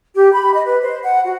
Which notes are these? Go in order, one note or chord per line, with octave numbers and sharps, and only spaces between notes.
G4
B5
D#5
B4
C5
F#5
F#4